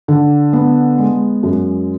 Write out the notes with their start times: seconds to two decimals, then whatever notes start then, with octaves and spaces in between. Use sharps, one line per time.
0.08 D3
0.53 B3
0.98 G#3
1.43 F#2